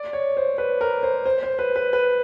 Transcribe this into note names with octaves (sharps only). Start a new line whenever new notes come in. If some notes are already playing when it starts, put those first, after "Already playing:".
Already playing: D5
C#5
C5
B4
A#4
C5
C5
C5
B4
B4
B4